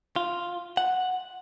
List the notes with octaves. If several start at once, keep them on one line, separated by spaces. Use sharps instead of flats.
F4
F#5